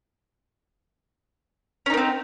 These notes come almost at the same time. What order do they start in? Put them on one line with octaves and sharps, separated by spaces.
C#4 D#4 A#3 C4